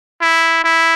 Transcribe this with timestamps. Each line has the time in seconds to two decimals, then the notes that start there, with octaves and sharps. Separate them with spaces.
0.22 E4
0.64 E4